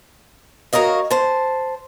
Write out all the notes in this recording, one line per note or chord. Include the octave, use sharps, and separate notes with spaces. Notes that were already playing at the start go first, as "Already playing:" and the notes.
F#4 A#4 C#5 D#5 F5
C5 A5